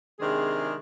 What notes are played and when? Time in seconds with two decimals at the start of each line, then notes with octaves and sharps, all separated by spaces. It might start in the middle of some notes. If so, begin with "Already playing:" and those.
0.20 C3 D#3 G#3 C4 D4 G#4